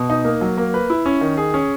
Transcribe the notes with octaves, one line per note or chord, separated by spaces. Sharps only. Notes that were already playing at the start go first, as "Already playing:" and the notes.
Already playing: B2
D#4
A#3
F#3
A#3
B4
E4
C#4
D#3
G#4
C#4